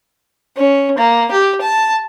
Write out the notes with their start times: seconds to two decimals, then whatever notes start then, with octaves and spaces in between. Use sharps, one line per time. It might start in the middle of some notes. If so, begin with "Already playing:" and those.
0.56 C#4
0.98 A#3
1.31 G4
1.61 A5